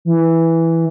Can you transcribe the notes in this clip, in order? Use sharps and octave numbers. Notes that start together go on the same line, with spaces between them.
E3